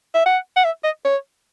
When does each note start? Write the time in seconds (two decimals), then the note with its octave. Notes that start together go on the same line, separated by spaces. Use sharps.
0.14 E5
0.26 F#5
0.56 F#5
0.65 E5
0.84 D#5
1.04 C#5